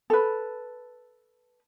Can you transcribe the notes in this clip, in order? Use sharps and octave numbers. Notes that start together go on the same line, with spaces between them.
A4 B4